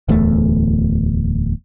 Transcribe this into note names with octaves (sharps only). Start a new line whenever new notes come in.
D1 E2 A3